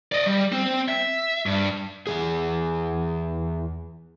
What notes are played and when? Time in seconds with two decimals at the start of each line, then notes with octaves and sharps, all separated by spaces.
0.12 D5 D#5
0.27 G3
0.52 C4
0.88 E5
1.46 G2
2.07 E2 F3 G#4